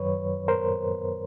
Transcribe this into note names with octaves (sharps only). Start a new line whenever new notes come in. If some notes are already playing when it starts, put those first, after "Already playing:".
Already playing: F#2 D#3 F#3 B4 C#5
A#4 C5